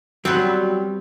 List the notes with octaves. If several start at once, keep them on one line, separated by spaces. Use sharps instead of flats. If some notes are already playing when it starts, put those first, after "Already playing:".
F#3 G3 B3 C4